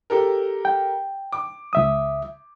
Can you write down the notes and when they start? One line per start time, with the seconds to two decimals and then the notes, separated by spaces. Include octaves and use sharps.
0.10 G4 A4 A#4
0.65 G5
1.33 D6
1.73 C#2 E5 D#6